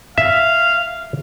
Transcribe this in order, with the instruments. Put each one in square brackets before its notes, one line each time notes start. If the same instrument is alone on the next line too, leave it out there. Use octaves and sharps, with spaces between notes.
[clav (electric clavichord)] E5 [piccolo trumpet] F5